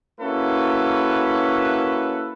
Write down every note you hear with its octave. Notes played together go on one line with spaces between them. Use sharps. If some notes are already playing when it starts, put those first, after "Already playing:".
A#3 C#4 E4 F#4 A4 B4